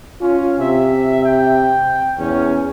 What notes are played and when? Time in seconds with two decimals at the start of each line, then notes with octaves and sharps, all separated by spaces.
0.21 C#4 F4
0.59 C3 E5
1.24 G5
2.18 E2 C#4